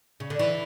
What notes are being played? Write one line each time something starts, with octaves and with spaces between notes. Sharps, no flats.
C#3
D3
E3